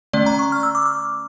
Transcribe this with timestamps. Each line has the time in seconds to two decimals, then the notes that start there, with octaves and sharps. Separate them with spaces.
0.13 D3 A3 C#4 D5
0.26 A#5
0.39 C#6
0.52 F6
0.63 E6
0.75 D6
0.86 E6